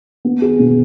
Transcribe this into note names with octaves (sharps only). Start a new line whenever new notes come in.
B3
G#4
B2